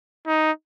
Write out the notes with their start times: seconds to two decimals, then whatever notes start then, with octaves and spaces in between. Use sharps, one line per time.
0.26 D#4